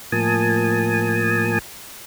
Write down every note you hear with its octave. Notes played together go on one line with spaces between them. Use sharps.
A2 F3 A#3 G#5 A5 D#6